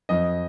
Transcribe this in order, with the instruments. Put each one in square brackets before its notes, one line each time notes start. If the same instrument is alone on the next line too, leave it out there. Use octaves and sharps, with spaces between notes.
[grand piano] F2 D#5